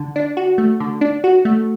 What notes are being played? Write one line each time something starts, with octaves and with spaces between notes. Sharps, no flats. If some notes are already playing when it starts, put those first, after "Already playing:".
Already playing: D3
D4
F#4
A3
D3
D4
F#4
A3